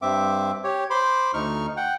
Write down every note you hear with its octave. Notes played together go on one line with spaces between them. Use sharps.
G2 C4 E5 D6
G4 C#5
C5 B5 C6 D6
D2 D#4 C#6 F6
F#5 G5